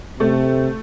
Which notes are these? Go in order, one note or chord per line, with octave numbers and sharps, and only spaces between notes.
C3 A3